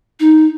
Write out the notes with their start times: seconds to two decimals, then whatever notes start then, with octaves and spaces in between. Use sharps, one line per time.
0.20 D#4